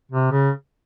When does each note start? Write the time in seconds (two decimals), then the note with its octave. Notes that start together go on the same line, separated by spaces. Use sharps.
0.11 C3
0.32 C#3